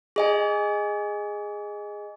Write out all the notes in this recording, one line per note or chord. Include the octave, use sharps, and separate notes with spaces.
G#4 D#5 G#5